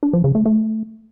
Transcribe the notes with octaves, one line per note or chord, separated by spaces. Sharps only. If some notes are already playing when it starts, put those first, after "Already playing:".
D4
F3
C#3
A3
A3